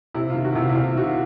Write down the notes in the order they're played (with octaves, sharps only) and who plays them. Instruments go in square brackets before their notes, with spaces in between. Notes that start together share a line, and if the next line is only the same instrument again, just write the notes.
[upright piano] C3 E4
D#3 F4
F#4
C3 E4
F4
E4
C3 F4
D#3 F#4
F4